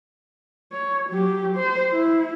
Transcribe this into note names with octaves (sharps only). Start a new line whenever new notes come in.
C#5
F#3 G4
C5
E4